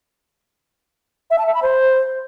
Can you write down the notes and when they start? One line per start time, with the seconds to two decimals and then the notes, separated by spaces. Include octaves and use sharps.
1.30 E5
1.38 A5
1.46 E5
1.54 B5
1.62 C5